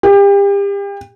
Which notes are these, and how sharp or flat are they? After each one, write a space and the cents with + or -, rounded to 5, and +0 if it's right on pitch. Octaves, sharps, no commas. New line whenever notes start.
G4 +35